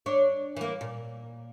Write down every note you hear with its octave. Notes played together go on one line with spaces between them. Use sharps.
D4 C#5
E3 A#3
A#2